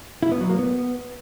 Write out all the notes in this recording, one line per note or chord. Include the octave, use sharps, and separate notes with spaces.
E4
B3
F#3
A#3
B3